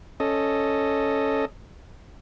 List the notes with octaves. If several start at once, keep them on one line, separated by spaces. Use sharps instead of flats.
C#4 A4 D#5